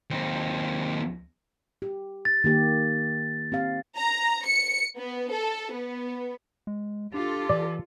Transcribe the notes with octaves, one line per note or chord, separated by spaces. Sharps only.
D#2 C4
G4
A6
D#3 A#3 G4
C4 G4 F5
A#5
C#7
B3
A4
B3
G#3
D4 F4 G4 A4
E3 D5